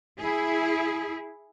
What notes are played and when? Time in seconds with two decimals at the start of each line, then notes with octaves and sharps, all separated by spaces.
0.19 E4 G#4